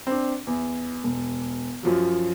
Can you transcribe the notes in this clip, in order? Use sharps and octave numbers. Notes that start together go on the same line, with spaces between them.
C4 D4
E2
E1
F#2 F3 F#3